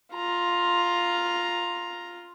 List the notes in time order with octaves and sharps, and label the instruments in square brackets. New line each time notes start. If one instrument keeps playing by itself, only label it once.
[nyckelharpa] F4 A#5